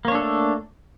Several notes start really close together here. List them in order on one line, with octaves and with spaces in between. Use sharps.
A#3 C#5 D4 A4 A3